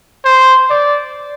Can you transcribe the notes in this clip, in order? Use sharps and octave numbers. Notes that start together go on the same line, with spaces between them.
C5
D5